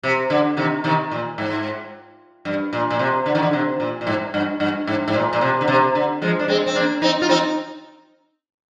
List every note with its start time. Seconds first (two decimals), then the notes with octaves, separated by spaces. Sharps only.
0.03 C3
0.30 D3
0.57 C3 D#3
0.84 C3 D#3
1.11 A#2
1.38 G#2
2.45 G2
2.73 A#2
2.90 A#2
2.99 C3
3.26 D3
3.35 D#3
3.42 D3
3.53 C3
3.80 A#2
4.01 A#2
4.07 G#2
4.34 G2
4.60 G2
4.87 G#2
5.08 G#2
5.14 A#2
5.33 A#2
5.41 C3
5.61 D3
5.68 C3
5.95 D3
6.22 F3 G#3
6.39 D4
6.48 G#3 C4
6.66 C4
6.75 A#3 D4
7.02 C4 D#4
7.22 F4
7.29 C4 D#4